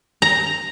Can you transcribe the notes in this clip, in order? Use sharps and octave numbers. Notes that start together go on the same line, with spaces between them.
A#5